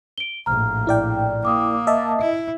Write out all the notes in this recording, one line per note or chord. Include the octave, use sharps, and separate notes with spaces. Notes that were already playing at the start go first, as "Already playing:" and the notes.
D7 G7
A#1 A2 A#5 F6
E4 D5 G5
A#3 D6 D#6
D#5 E5 A5
E4